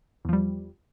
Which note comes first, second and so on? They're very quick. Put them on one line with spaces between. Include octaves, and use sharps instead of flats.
E2 F3 G3